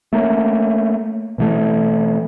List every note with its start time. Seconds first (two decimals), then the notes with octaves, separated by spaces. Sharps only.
0.13 A3 A#3 C4 C#4
1.38 B2 E3 A3